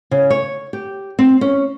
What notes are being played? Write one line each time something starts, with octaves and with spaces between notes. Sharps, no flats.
C#3
C#5
G4
C4
C#4